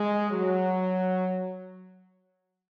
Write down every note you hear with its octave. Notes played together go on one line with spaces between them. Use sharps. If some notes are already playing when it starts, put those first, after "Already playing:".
Already playing: G#3
F#3